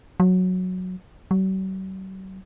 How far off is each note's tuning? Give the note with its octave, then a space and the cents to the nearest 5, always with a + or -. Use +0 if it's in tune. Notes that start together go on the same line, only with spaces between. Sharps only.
F#3 -10
F#3 +45